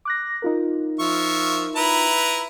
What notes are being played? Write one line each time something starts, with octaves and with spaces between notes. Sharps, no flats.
D6 F#6 A#6
D#4 F4 A#4
F3 E5 C#6
E4 B4 A#5